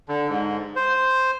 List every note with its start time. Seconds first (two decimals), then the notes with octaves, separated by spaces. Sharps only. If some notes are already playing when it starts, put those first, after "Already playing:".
0.09 D3
0.29 G#2
0.76 C5